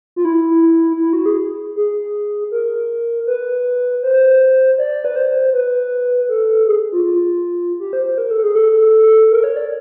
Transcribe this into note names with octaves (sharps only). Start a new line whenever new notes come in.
F4
E4
E4
F#4
G#4
G#4
A#4
B4
C5
D5
B4
C5
B4
A4
G#4
F4
F4
G4
C5
C5
A#4
A4
G#4
A4
A#4
C#5
D5